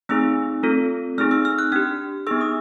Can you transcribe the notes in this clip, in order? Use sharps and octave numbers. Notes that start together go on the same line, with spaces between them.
A3 C4 D#4 G#4 E6
A3 C4 F4 A4
A3 C4 D#4 G#4 F6
E6
F6
F#6
D4 G4 F6
B3 D#4 G#4 E6
D#6